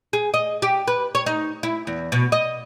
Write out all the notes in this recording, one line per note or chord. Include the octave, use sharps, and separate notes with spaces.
G#4
D#5
G4
B4
C#5
D#4
E4
E2
B2
D#5